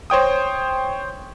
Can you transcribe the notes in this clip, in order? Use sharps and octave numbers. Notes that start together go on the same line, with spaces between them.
C5 C#5 G5 D#6